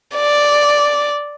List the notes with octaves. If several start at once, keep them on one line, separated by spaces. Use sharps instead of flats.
D5